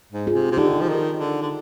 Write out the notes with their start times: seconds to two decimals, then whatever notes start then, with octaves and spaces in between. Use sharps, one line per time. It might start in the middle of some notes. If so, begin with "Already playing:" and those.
0.12 G#2
0.27 F4 G#4
0.34 C3
0.52 C3
0.58 D3 D#4 G4
0.81 F3
0.89 D#3
1.19 D3
1.42 D3